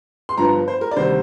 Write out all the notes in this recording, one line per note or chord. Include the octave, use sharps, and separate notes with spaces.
C6
G1 G2 F3 A#5
C5
A#4
D5
D2 C3 D#3 G3 C5